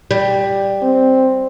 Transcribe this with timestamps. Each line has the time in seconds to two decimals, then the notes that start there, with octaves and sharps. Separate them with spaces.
0.11 G3
0.83 C4